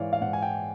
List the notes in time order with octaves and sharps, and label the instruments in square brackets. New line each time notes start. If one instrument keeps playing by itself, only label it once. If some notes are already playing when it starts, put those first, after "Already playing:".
Already playing: [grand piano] G#2 E3 C#5 D5 F5
F5
G#2 F#5
G#5
G5